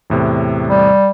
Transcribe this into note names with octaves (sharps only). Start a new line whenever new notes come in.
E2 A2 C3
G3